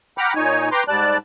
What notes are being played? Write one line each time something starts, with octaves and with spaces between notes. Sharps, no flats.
F#5 G5 A#5 B5 D6 F6
A#2 D#4 C#5 G#5
B4 G5 A#5 C6 D6
G#2 G3 D5 A5 F#6